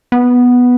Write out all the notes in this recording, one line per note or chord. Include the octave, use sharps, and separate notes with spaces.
B3